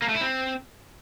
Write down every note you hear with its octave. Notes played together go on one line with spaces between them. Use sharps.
A#3
A3
E4
C4